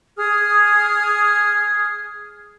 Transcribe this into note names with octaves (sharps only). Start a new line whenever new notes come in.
G#4 D#6 F6 G#6